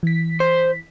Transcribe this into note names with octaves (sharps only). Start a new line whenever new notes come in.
E3 B6
C5